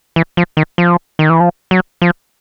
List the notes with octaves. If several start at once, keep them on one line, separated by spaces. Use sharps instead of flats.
E3
F3
D#3
F3
D#3
E3
F3
F#3
F3